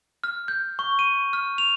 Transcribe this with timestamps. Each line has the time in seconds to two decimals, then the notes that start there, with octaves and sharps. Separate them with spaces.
0.24 F6
0.48 G6
0.79 C#6
0.99 D#7
1.33 F6
1.58 F7